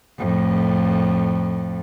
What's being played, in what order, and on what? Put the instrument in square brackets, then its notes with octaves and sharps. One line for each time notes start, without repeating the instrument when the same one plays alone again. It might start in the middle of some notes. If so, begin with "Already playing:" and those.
[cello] F2 A2